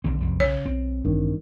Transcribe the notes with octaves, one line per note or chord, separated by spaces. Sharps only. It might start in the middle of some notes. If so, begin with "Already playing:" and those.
D#1 B1 D3 C4
C2 F2 G3
C#3 C#5
B1 C4
A1 G2 D#3